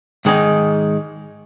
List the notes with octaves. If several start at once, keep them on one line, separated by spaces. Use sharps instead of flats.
G#2 D#3 G#3 D#4